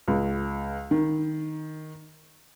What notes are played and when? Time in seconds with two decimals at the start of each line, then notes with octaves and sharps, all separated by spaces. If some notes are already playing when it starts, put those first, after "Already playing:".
0.08 C#2
0.91 D#3